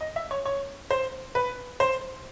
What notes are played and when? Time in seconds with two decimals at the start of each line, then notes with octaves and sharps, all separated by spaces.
0.01 D#5
0.16 E5
0.31 C#5
0.45 C#5
0.91 C5
1.35 B4
1.80 C5